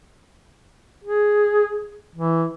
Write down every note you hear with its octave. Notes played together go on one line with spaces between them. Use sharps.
G#4
E3